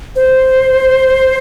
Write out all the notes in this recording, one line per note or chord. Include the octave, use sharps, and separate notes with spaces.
C5